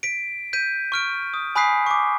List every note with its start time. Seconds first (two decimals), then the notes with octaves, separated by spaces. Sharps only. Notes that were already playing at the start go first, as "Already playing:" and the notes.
0.03 B6 D7
0.53 G6 B6 D#7
0.92 C#6 F6 D7
1.34 D#6
1.56 G#5 B5 D#6 F#6 B6 C7
1.86 C#6 D6